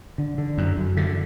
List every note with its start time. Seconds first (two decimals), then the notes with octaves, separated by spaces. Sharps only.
0.18 D3
0.38 D3
0.58 F#2
0.77 F#2
0.97 D3